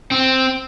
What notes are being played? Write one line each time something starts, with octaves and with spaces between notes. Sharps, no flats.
C4